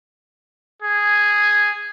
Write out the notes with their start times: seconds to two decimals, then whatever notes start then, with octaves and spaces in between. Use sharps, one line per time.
0.82 G#4